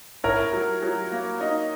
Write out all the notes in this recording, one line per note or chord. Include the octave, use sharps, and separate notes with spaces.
E4 A#4 C#5
F#3
F#3
A#3
D#4